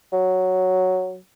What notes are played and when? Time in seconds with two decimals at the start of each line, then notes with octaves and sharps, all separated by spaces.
0.12 F#3